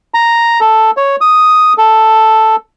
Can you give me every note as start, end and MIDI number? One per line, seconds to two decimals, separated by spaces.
0.14 0.60 82
0.61 0.91 69
0.97 1.16 73
1.21 1.73 87
1.78 2.56 69